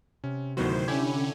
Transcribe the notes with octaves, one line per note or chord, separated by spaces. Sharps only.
C3 C#4
D2 A2 D#3 F#3 B3 F#4 C5
D3 C#4 E4 G4 G#5 G#6